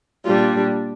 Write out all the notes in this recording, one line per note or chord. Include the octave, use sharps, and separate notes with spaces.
A#2 G3 D4 F4